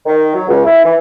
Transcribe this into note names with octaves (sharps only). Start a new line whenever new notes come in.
D#3
F#3
C#2
E4
E3